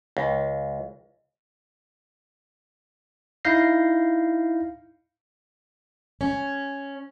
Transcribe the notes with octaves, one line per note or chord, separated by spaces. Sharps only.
C#2
D#4 E4 F5 G6 A#6 C7
C#4